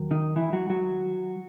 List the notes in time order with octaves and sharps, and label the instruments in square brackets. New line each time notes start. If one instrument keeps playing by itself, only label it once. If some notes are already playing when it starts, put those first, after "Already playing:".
Already playing: [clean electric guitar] D#2 F#3
D#3 D#4
E3 E4
F#3 F#4
F#3 F#4